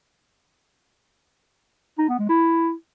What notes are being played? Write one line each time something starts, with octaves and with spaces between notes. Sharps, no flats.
D#4
B3
G#3
E4